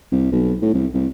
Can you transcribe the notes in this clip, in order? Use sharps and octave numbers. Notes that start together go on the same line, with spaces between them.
C2
B1
A2
C2
C2